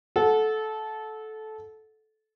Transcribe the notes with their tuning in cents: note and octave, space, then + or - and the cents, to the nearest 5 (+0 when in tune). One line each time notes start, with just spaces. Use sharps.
A4 -15 F#5 -20